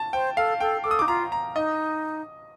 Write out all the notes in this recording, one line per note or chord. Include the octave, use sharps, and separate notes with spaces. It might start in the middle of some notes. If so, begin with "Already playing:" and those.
Already playing: A5
C5 G5
A4 F5
A4 G5
A4 D6
D#6
D#4 D6
F4 A#5
A#5
D#4 D#5